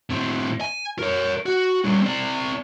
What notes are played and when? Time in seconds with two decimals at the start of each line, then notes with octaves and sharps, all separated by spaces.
0.10 A2 C4
0.61 G#5
0.99 A#4 C#5
1.46 F#4
1.85 G3 C#4
2.02 C4 D5